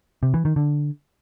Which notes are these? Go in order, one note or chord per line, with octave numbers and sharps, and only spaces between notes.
C3
E3
D#3
D3